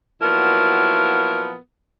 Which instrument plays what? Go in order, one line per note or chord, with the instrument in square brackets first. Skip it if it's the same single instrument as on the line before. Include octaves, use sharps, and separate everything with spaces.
[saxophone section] A#2 F3 F#3 B3 E4 A#4